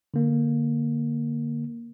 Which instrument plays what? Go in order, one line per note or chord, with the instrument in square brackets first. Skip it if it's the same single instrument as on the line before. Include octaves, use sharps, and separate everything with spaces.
[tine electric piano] D3 A#3